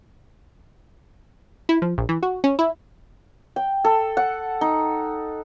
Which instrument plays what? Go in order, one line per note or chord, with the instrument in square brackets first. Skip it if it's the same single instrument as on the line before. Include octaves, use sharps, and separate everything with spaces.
[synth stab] E4
F3
A#1
E3
F#4
C#4
E4
[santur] G5
A4
F#5
D#4